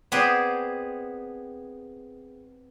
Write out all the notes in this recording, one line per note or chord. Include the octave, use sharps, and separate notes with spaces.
B3 C4 G#4 B4 C5 D5